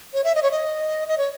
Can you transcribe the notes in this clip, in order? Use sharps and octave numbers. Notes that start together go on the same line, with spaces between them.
C#5
E5
D#5
C#5
D#5
D#5
C#5